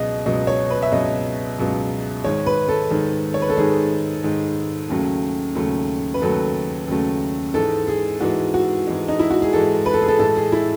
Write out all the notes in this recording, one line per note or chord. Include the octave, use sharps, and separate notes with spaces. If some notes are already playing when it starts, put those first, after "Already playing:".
Already playing: C#2 B2 F#3 G#4 D#5
C#2 B2 F#3 D#5
C#5
B4
E5
C#2 B2 F#3 D#5
C#2 B2 F#3
G#2 D#3 G#3 C#5
B4
A4
G#2 D#3 G#3
C#5
B4
A4
G#2 D#3 G#3 G#4
G#2 D#3 G#3
D#2 C#3 F#3 A3
D#2 C#3 F#3 A3
B4
D#2 C#3 F#3 A3 A4
D#2 C#3 F#3 A3
G#2 E3 G#3 A4
G#4
G#2 E3 G#3 F#4
F#4
G#2 E3 G#3
D#4
E4
F#4
G#4
G#2 E3 G#3 A4
B4
A4
G#4
A4
A2 E3 G#3 A4
G#4
E4